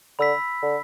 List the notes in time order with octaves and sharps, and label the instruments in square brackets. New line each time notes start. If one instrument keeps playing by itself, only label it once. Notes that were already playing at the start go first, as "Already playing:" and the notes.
[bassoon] D3 [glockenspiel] B5 E6 B6
[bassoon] D3